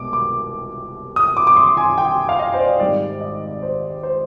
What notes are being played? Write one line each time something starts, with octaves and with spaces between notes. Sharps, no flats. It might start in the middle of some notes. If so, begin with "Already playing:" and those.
Already playing: C2 B2 G#3 B3 D6
D6
D#6
D6
D6
C6
G#5
G5
F5
D#5
C5
D5
G#1 G#2 D#3 G3 D5
D#5
C5
C5